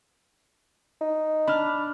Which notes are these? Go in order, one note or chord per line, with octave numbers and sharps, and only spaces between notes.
D#4
D4 B5 F6